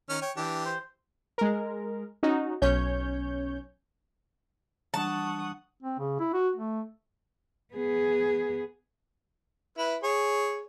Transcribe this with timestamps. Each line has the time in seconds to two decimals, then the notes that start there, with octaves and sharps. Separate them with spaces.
0.09 D#3 C#4 F6
0.22 C#5 G5
0.37 E3 D4 G4
0.65 C5
1.38 G#3 A#4
2.23 C#4 D#4 F#4
2.62 B1 C#4 C#5 G6
4.94 E3 G3 D4 F#5 A5 C#6 D#6
5.83 C4
5.99 C#3
6.20 E4
6.34 F#4
6.56 A3
7.74 B3 G#4
9.78 E4 B4
10.03 G#4 C#5